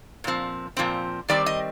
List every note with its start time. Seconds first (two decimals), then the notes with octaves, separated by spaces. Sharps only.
0.24 A#2 F3 C4
0.77 A#2 F3 C4
1.29 D#3 G3 C4 D5
1.46 D#5